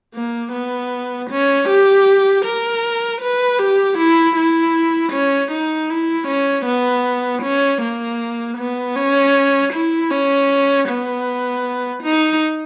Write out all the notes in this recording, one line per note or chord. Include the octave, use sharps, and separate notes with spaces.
A#3
B3
C#4
G4
A#4
B4
G4
E4
E4
C#4
D#4
E4
C#4
B3
C#4
A#3
B3
C#4
E4
C#4
B3
D#4